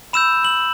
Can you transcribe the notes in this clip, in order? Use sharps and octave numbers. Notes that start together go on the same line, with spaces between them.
B5 E6 G6 E7
F#7